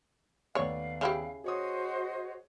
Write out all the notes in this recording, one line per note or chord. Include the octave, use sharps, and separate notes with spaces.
D#2 A3 B3 C#5 D5 F5
C#3 E4 G4
F#4 G#4 C5 C#5 D#5 D#6